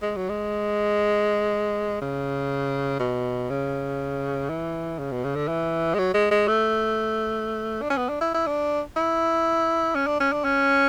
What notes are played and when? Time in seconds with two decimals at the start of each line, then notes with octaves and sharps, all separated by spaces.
0.02 G#3
0.16 F#3
0.29 G#3
2.02 C#3
3.00 B2
3.50 C#3
4.49 E3
4.99 C#3
5.12 B2
5.24 C#3
5.35 D3
5.48 E3
5.94 G#3
5.99 F#3
6.14 G#3
6.31 G#3
6.48 A3
7.82 D4
7.90 C#4
7.97 B3
8.09 D4
8.21 E4
8.34 E4
8.47 D4
8.96 E4
9.95 C#4
10.07 D4
10.20 C#4
10.32 D4
10.44 C#4